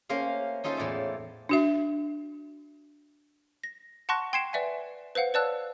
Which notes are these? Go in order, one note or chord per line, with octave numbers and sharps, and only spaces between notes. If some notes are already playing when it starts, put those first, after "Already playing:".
A3 A#3 C#4 C5 F5
C#4 D#4 F4 A4 C5
E2 A2 D5 E5
D4 F#4 E5
A#6
F#5 A5 C6 C#6 F#6 A#6
G5 C6 G#6 C7 C#7 E7
B4 D5 E5 F#5 G#5
B4 C5 F5 F#5
B4 C#5 D5 A5 E6 F#6